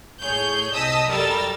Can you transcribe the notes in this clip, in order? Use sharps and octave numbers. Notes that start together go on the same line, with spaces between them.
A2 G#4 C#5 G6
C2 D#5 A5 D#6 E6 B6
F#2 G3 A4 A#4 E6 A6